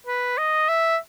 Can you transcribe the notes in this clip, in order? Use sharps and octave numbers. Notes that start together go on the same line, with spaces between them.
B4
D#5
E5